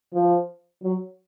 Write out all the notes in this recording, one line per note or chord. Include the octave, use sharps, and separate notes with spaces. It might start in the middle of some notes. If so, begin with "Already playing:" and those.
F3
F#3